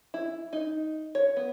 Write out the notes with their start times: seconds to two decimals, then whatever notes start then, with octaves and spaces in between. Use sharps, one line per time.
0.14 E4
0.53 D#4
1.15 C#5
1.37 B3